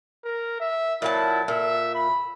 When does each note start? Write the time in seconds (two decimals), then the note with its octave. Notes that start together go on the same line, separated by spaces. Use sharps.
0.25 A#4
0.60 E5
1.02 A#2 F#3 E4 A5
1.48 A#2 E5
1.95 B5